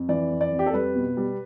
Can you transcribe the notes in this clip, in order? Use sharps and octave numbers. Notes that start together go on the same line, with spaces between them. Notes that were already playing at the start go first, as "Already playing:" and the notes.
Already playing: F2
E3 D5
F2
D5
F2
G4
A4
G3 B4
B2
G3